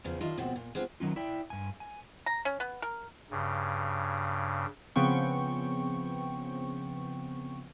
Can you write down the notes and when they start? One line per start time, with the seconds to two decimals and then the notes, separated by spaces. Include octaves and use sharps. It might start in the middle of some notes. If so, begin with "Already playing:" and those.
0.04 E2 C#3 F3
0.21 D#3 D4 F4 D#5 E5
0.37 D#2 G#2 B2 F3 C4
0.56 A#2
0.75 G#3 B3 C4 D4 F4
1.00 D#3 F#3 C#4 F4
1.16 E4 D5 G5
1.50 G2 G#5
1.80 G#5
2.26 A#5
2.45 C#4
2.60 B3
2.82 A#4
3.31 G2 C#3
4.96 C#3 F3 B3 C4 G5 C#6